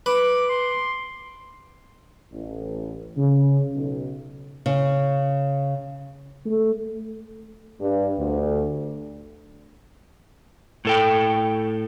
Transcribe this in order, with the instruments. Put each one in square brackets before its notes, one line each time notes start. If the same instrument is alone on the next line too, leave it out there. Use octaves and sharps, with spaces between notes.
[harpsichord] B4 [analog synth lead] D6
[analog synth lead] C6
[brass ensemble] A1
C#3
B1
[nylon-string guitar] C#3
[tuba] A3
[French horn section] G2
D2
[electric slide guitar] A2 A4 G5